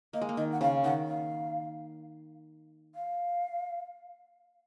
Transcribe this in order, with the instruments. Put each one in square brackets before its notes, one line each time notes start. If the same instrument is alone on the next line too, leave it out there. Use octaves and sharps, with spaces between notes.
[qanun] A#3 [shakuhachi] D#5
[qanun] G#3
A#3
[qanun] D#3 [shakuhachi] D#5
[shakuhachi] F#5
[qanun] C#3 [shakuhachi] F5
[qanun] D#3 [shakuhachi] F#5
[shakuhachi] F5
F5